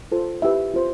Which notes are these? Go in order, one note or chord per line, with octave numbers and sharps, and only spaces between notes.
F4 A4 C5
E4 G4 B4 E5
F4 C5